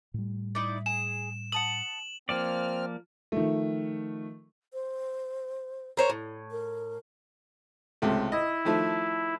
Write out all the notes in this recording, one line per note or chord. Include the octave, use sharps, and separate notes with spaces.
A2 G3
D#4 E4 D5
G#4 E7
F#5 A5 D#6 F#7
F3 A#3 C4 D5 F6
D#3 F3 A3
C5
A#4 C5 C#5
A2
A#4
C#2 C3 A3
E4 D#5
D#3 F3 A3